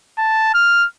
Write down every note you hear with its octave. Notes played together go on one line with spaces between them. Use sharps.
A5
F6